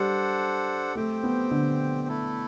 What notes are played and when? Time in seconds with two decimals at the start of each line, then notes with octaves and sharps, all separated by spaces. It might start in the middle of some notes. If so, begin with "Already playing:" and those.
Already playing: G3 D4 A4 C5 F#5
0.95 A3 C4 G4 C5 G5
1.23 B3
1.51 D3
2.08 A3 E4 A4